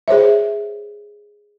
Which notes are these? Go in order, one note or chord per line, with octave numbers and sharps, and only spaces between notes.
G#4 C5 C#5 E5